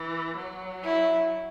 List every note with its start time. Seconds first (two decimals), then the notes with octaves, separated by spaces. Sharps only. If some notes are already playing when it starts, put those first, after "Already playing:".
Already playing: E3
0.37 F#3
0.84 E4